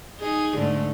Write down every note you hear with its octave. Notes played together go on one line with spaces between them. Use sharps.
D#4 G#4
G#2 D3 A3